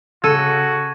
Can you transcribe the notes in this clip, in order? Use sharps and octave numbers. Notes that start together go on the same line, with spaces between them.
C#3 F#4 A4 G#6 D#7